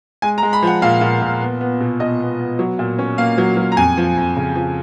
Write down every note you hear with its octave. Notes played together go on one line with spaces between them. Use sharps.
G#3 G#5
A#5
G#3
B5
F3 F#5
A#2 F5
A#2
A#2
B3
B3
B2
B2 D#5
B3
B3
F#3
A#2
C#4
A#3 F5
F#3
F#3
A#5
F2 G#5
F3
F2
C#3
F3